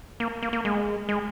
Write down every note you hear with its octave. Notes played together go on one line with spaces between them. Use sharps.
A#3
A#3
A#3
G#3
G#3